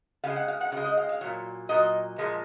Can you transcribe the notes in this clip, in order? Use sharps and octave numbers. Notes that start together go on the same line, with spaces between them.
C#3 G#3 F5
F#5
F5
F#5
C#3 G#3 F5
D#5
F5
F5
A#2 F#3
A#2 F#3 D#5
A#2 F3 G#3